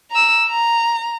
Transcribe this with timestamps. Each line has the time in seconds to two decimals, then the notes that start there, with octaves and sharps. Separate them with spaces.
0.11 A#5 E6
0.48 A#5